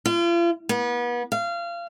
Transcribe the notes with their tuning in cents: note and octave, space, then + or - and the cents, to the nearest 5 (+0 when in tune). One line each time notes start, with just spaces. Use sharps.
F4 -40
B3 -35
F5 -25